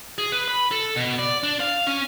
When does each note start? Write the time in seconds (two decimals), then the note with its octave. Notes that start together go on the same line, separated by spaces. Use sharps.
0.18 G#4
0.32 B4
0.48 B5
0.71 A4
0.96 B2
1.19 D5
1.43 D4
1.60 F5
1.87 C#4